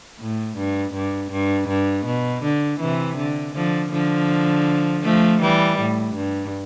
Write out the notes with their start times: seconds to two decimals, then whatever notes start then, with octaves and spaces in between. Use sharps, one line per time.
0.20 A2
0.57 G2
0.93 G2
1.31 G2
1.68 G2
2.05 B2
2.43 D3
2.79 C3 E3
3.17 D3
3.54 D3 F3
3.91 D3 F3
5.03 F3 A3
5.41 E3 G3
5.78 A2
6.14 G2